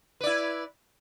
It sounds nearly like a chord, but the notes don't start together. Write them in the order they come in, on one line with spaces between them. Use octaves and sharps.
B4 D5 E4